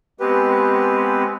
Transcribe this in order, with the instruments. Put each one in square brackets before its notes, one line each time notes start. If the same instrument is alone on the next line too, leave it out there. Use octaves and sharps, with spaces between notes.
[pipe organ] G#3 B3 C4 [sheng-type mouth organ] G4 B4